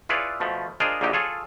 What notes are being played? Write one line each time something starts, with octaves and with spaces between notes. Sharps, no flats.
E4 F4 G#4 B4 C#5 D5
B2 F3 A3
D4 F4 G#4 A#4 C5 D#5
A#1 A#2 D3 F#3 D#4 G4
F4 G#4 A4 C#5